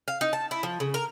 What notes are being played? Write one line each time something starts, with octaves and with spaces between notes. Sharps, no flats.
F5
D#4
A5
E4
F3
C#3
A#4